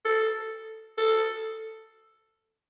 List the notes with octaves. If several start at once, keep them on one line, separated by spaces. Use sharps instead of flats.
A4
A4